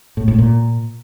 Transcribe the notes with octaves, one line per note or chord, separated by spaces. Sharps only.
A2
A2
A#2